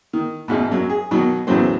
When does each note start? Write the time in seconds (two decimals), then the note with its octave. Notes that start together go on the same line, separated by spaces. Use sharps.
0.13 D#3
0.48 A1 G#2 B2
0.71 F#2 F#3
0.90 G#4
1.11 B2 D#3 F#3
1.47 E2 A2 C#3 E3 F#3 C5